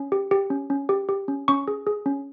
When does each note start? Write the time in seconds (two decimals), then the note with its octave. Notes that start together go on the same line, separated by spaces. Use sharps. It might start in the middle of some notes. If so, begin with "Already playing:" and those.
Already playing: C#4
0.12 G4
0.31 G4
0.50 C#4
0.70 C#4
0.89 G4
1.09 G4
1.28 C#4
1.48 C#4 C#6
1.68 G#4
1.87 G#4
2.06 C#4